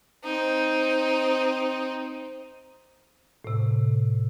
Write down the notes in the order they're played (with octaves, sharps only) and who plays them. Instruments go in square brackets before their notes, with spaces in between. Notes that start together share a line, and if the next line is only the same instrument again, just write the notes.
[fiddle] C4 D#4
[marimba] A2 C3